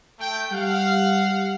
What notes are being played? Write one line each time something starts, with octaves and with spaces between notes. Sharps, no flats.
A3 G5
G3 F5 F#5